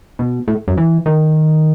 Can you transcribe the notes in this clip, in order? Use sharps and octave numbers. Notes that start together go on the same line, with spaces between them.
B2
A2
F#2
E3
D#3